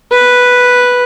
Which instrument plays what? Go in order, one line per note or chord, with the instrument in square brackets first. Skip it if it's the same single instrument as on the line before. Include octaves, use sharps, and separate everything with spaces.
[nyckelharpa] B4